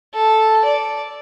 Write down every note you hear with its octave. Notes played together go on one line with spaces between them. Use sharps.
A4
D5